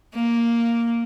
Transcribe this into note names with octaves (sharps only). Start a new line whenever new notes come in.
A#3